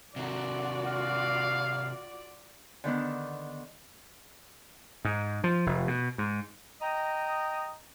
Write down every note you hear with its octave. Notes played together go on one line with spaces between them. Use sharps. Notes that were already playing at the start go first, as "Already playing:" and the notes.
C3 D#3 F4 F#4 D5
F5
D3 D#3 B3 D4
G#2
F3
F1
B2
G#2
D#5 G5 A#5 D#6